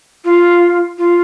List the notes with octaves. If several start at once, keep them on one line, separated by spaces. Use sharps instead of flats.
F4
F4